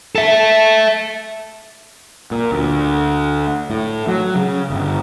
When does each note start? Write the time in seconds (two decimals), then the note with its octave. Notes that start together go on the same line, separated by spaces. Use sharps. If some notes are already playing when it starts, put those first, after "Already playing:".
0.15 A4 E5
2.31 A#2
2.52 D2
3.70 A2
4.08 F#3
4.36 C#3
4.70 G1